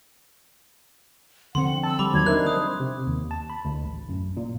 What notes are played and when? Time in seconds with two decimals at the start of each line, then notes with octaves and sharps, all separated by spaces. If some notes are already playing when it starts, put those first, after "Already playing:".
1.55 D3 F3 C4 F#5 C6
1.84 A5 E6
1.99 G3 B5 D6
2.14 D#2 F#3 G#6
2.26 D4 D#4 A#4 C5 E5 F#6
2.47 D#6 F#6
2.80 C3
3.06 D#2
3.31 A5
3.50 B5
3.65 D2
3.85 A1
4.09 F#2
4.37 A#2